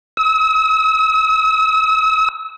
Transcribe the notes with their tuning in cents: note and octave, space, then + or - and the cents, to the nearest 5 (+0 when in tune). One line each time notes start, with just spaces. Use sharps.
E6 -45